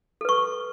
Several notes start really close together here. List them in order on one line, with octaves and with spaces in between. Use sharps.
A4 B4 C#6